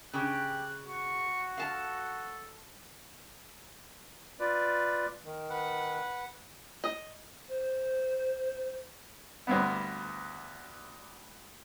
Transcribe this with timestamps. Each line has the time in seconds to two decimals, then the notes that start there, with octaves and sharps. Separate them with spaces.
0.13 C#3 G4 F#6
0.85 F#4 C#6
1.57 A4 F5 A5
4.39 F4 B4 D5
5.24 D#3
5.50 B4 F#5
6.84 D#5
7.49 C5
9.47 D2 G2 B3